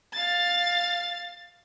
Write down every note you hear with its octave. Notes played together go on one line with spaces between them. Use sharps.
F5 A6